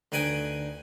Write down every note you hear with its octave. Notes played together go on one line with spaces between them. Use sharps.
D2 D#4 B4 G5 G#5 D#6